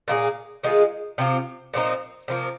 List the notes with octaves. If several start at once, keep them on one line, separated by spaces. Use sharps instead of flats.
A#2 A#3 D#4 G#4
D#3 G#3 F4 G#4
C3 F3 C4 F4
A#2 F3 C4 D#4
C3 F3 A#3